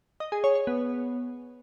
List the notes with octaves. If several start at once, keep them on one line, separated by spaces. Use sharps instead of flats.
D#5
G#4
C#5
C#5
B3